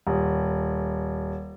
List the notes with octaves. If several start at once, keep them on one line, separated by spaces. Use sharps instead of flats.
D#1